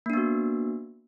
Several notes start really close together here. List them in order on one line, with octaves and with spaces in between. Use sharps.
A#3 D4 B3 F#4